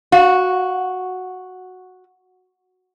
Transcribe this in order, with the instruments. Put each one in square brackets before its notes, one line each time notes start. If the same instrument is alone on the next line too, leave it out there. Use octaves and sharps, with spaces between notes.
[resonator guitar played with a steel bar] F#4 [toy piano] F5